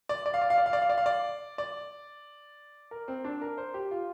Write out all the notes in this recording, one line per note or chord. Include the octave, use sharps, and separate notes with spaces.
D5
D5
F5
D5
F5
D5
F5
D5
F5
D5
F5
D5
D5
A#4
C4
D4
A#4
C5
G4
F4